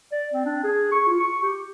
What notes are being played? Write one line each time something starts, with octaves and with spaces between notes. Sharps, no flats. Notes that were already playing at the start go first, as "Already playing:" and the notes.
D5
C4
D4
G#4
C#6
F4
C#6
G4